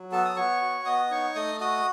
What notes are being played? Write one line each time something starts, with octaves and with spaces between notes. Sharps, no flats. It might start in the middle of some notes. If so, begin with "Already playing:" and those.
Already playing: F#3
B3 A4 A5
D#6
B3 C#5 C#6
F#4
B3 D#5 D#6
D#4 C#5 C#6
A3 D#5 D#6
F#4 D#5 D#6